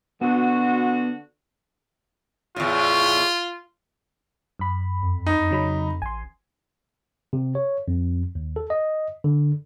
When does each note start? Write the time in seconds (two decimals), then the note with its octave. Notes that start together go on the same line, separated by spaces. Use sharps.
0.21 D3 B3 F#4
2.56 E2 A2 F4
4.59 F#2 B5
5.02 F2
5.27 D#4
5.51 C#3 F#3 B5
6.02 A1 G#5 C6
7.33 C3
7.55 C#5
7.88 F2
8.35 D#2
8.56 A4
8.70 D#5
9.24 D3